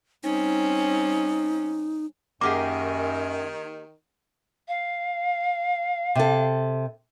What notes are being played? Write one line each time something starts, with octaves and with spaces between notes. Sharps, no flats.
G3 C4 C#4 D#4
F#2 D#3 A#3 G4 G#4 F#5 D6
F5
C3 A4